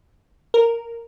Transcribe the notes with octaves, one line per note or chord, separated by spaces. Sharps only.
A#4